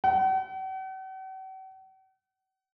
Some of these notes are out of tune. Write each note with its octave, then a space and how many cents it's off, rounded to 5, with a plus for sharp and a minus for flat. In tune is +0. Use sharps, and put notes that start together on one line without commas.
F#5 +45